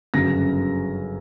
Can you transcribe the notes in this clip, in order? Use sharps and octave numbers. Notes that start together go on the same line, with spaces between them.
G1 F#2 C#3 F#3 A#6